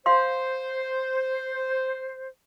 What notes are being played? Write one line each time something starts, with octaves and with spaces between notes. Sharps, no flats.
C5 F5 C6